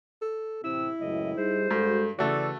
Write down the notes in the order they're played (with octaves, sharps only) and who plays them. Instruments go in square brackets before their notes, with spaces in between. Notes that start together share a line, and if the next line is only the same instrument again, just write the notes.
[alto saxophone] A4
[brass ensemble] A1 C3 [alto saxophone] E4 [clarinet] E6
[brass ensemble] C#2 F#2 A2 [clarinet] D#5
[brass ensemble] G3 D#4 G#4 [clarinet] C5
[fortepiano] G2 [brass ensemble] G#3 F#4 A4
[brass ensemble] C#3 E3 [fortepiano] A3 F#4 [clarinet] A4 [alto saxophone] D5